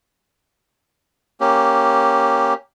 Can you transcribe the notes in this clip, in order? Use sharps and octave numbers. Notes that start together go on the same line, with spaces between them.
A#3 C#4 G4